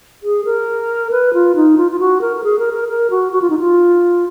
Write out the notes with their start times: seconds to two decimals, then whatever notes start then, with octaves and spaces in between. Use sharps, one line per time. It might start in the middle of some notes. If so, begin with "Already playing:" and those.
0.23 G#4
0.45 A#4
1.11 B4
1.34 F4
1.55 D#4
1.78 F4
1.92 F4
2.00 F#4
2.21 A#4
2.36 A#4
2.44 G#4
2.59 A#4
2.73 A#4
2.88 A#4
3.10 F#4
3.33 F#4
3.41 F4
3.50 D#4
3.59 F4